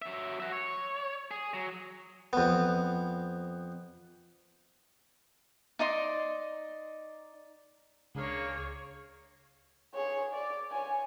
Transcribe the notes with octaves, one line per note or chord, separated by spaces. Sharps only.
F#3 E5
F#4 E5
C#5
G#4
F#3
F2 B3
D#4 D5 D#5 C6
C#2 A#3 D4 G#4 C#5 F5
G#4 C#5
D5
C#5 G#5